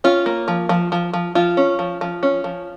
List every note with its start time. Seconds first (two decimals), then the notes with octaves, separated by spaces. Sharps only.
0.04 C#4 F4
0.26 A#3
0.48 F3
0.69 F3
0.92 F3
1.13 F3
1.35 F3 F4
1.57 C#4
1.79 F3
2.01 F3
2.23 C#4
2.44 F3